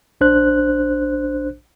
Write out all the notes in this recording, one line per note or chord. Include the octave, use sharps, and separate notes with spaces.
A#1 D4 C5 F#6